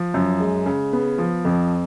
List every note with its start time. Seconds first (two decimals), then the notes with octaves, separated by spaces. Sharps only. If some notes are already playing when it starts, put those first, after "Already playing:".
Already playing: F3
0.14 F#2
0.40 G#3
0.66 C#3
0.93 B3
1.18 F3
1.45 F2